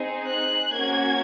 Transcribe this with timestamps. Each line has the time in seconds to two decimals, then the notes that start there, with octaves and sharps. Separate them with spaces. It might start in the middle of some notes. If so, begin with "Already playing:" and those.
Already playing: C4 D#4 G#4
0.26 F#6
0.72 A#3 C#4 F#4 G#6